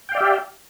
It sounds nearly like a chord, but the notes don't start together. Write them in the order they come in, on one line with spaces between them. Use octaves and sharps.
G5 F5 D5 E5 G4